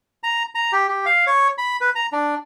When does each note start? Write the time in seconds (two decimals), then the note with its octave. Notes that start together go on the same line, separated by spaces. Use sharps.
0.23 A#5
0.55 A#5
0.72 G4
0.88 G4
1.06 F5
1.27 C#5
1.58 B5
1.81 B4
1.95 A#5
2.12 D4